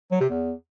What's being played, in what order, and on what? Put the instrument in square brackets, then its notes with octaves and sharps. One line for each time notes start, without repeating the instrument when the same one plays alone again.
[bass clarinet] F#3
C3
E2